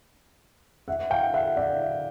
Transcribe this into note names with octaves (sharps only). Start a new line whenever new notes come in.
E5 F#5
F5 G5
E5 F#5
D5 E5